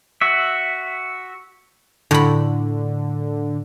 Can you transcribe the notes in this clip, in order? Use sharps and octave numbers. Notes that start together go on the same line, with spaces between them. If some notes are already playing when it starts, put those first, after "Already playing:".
F#4 E5
A2 D3 B5